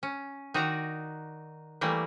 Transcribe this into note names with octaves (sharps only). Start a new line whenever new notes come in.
C#4
D#3 D#4 F#4 D5 A#5
E3 G3 A3 A#3